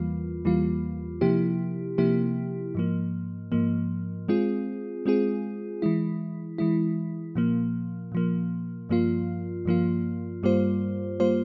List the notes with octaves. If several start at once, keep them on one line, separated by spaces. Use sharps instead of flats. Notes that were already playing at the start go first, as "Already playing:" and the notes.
Already playing: E2 E3 G3 A#3 F4
E2 E3 G3 A#3 F4
C3 F3 A#3 E4 G4
C3 F3 A#3 E4 G4
G#2 F3 A#3
G#2 F3 A#3
G#3 C4 F4 G#4
G#3 C4 F4 G#4
E3 G#3 E4
E3 G#3 E4
A#2 F3 A#3
A#2 F3 A#3
G2 F3 A#3 F4
G2 F3 A#3 F4
G2 G3 A#3 F4 C5
G3 A#3 F4 C5